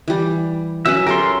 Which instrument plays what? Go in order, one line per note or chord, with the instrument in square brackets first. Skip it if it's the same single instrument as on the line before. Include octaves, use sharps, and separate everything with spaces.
[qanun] E3 G3
[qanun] F#3 C#4 B4 [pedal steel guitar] E5
[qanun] G4 A4 C#5 [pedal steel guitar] A#4 C6